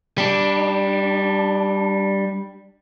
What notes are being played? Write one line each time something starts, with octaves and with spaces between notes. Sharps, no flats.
G3 D4